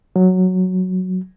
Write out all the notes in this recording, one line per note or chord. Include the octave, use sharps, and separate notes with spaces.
F#3